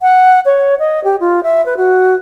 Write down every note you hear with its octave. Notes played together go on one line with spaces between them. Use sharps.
F#5
C#5
D#5
G4
F4
E5
B4
F#4